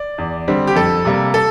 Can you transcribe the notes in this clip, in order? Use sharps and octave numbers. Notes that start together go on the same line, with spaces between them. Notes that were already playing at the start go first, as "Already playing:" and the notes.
Already playing: D5
E2
D3 G3 C4
G4
F2 A4
C3 G3 A#3
A4